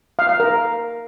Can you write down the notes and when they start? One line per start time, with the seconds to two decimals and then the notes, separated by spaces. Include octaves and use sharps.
0.19 F5
0.29 F5
0.40 A#4